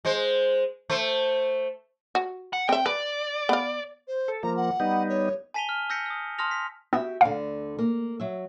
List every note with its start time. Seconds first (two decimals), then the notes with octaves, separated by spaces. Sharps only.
0.05 G#3 C5
0.90 A3 C5
2.15 F#4
2.53 F#5
2.69 C4 E5 G5
2.86 B4 D5
3.49 B3 F5
4.08 C5
4.28 A4
4.43 F3 A#3 A#5
4.57 F#5
4.80 G3 B3 D#4
5.09 C#5
5.54 G#5 A5 B6 D#7 F7 G7
5.69 F6
5.90 E6 G6 A#6 B6 C#7
6.06 D#6 E6
6.38 A5 C6 D#6 F6 A#6 F7
6.51 B6
6.93 B3 F#4 G4 E5
7.21 D2 D3 F5
7.79 A#3
8.20 F#3 E5